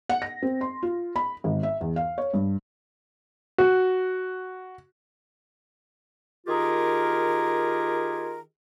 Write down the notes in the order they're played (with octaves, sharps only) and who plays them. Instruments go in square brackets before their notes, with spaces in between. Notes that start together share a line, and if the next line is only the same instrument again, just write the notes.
[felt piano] F#5
A#6
C4
C6
F4
B5
G#1
E5
E2
F5
C#5
G2
[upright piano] F#4
[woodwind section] D#3 F4 G4 G#4 A#4